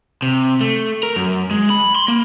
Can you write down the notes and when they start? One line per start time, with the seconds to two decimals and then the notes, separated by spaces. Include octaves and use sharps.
0.22 C3
0.61 A3
1.03 A#4
1.16 F#2
1.51 G#3
1.70 B5
1.95 C6
2.08 A#3